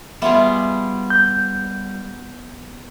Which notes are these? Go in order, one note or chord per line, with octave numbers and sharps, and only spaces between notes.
G3 B3 F4 G#4 D5 E5
G6